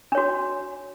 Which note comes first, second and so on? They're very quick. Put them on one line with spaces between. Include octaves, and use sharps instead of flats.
D4 C#5 F#4